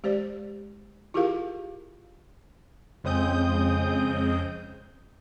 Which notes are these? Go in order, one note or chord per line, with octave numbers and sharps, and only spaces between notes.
G#3 G4 C5 D5
E4 F4 G4 G#4 A#4 F5
F2 C#3 G#3 C4 D#6 G6